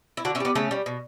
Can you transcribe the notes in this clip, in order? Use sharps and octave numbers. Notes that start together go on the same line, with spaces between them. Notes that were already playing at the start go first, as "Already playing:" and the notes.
E4
D3 D4 F#4
C#4 E4
G3 B3 D4
C#3 A3 C#4
G3
B2